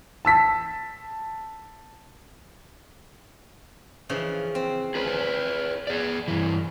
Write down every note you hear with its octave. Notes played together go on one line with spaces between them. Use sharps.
A5 E6 B6
C#3 E3 F3
C4
G#4 B4 C#5
G#4 D5
G2 E3